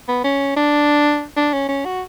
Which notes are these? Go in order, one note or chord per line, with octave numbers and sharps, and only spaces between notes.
B3
C#4
D4
D4
C#4
C#4
F#4